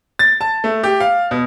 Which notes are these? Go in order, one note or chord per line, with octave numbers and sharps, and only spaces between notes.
A6
A5
A3
G4
F5
B2